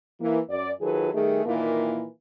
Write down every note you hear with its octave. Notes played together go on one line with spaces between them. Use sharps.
E3 A#3
F#2 D5
D#3 F#3 F4 G#4 A4 B4
D#3 G3 A3 G#4
A#2 D#3 E3 A#3